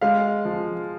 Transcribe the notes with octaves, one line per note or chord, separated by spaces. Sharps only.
G#3 F5
F3